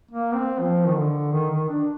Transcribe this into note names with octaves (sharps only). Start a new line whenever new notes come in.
A#3
C4
F3
D#3
D3
D#3
D#3
D4